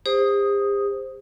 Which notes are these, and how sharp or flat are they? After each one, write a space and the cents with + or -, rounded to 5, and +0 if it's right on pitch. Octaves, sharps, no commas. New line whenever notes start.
G4 +45 C5 +0 D#6 +0